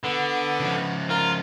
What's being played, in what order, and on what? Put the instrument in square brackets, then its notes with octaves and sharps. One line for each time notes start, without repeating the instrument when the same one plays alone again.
[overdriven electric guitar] D3 [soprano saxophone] B3
[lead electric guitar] C#3 F3
[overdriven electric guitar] F4 [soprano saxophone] A#4